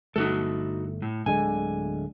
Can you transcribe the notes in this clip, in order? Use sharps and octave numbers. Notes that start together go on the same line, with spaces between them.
G1 A3 D#4 F#4 A4
A2
D1 D3 G#3 G#5